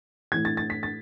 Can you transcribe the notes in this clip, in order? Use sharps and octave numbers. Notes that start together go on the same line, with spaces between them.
A2 E3 G#6
A6
A6
B6
A6